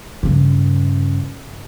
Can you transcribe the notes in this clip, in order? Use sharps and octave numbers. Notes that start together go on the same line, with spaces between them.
G2 C#3